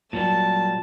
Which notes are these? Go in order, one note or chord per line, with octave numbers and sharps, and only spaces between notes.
A#2 F#3 G3 A5